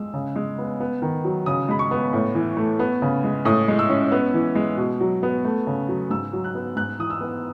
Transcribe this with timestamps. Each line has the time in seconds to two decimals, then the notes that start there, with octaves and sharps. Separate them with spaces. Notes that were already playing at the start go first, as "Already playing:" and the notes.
Already playing: G#3 E6
0.14 C#3
0.36 G#3
0.58 B3
0.80 B3
1.02 D#3
1.24 F#3
1.46 C#3 D#6
1.69 G#3 B5
1.79 C#6
1.91 B3
2.13 A2
2.35 E3
2.57 A3
2.79 B3
3.02 C#3
3.24 G#3
3.45 A2 D#6
3.68 G#3
3.79 E6
3.90 C#4
4.12 B3
4.34 E3
4.55 G#3
4.78 B2
5.01 F#3
5.23 B3
5.44 A3
5.67 C#3
5.89 F#3
6.10 G#2 E6
6.33 F#3
6.44 F#6
6.55 B3
6.76 G#2 F#6
6.99 E3 D#6
7.10 E6
7.21 B3